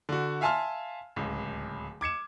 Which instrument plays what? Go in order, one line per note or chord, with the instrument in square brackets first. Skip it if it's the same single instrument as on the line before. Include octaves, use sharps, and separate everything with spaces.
[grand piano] D3 F#4
E5 F5 G#5 A5 C6 F6
D1 C#2
D6 G#6 C#7 E7